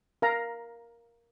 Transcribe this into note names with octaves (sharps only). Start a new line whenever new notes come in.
A#4 F5 A#5